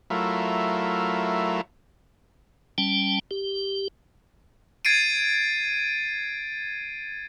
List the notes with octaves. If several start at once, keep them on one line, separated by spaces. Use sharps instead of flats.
F#3 A3 E4 F4 A#4
G3 C#4 G5 A5
G4
G#6 A6 C7 D7 D#7